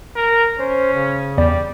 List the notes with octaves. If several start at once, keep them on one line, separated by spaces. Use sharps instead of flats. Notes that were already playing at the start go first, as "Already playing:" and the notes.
A#4
C#4 C5
C#3
E2 G3 D5